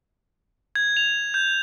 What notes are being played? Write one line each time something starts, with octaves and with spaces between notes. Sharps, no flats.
G#6
F7
G6